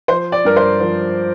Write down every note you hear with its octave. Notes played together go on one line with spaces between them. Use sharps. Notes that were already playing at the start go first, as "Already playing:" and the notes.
F3 C5
D5
G2 A#4
C5
F3